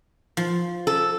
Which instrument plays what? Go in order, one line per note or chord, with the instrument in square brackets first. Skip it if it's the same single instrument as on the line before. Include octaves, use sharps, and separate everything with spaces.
[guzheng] F3
[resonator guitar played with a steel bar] A4